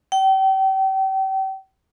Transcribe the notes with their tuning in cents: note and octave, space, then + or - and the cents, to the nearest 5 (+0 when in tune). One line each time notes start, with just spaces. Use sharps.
G5 -35